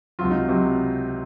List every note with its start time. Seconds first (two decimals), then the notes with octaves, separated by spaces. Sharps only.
0.19 C#2 C3 F#3 F4
0.31 D#4
0.48 C3 F#3